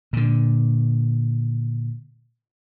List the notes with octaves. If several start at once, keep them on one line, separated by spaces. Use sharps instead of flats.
A#2 D3